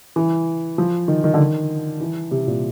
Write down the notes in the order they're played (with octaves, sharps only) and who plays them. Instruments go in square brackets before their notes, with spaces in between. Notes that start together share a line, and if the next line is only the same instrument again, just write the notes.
[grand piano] E3
F3
D#3
D#3
D3
D#3
E3
C3
A#2